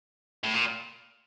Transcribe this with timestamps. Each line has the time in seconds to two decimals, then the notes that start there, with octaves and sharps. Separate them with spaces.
0.44 A2
0.54 A#2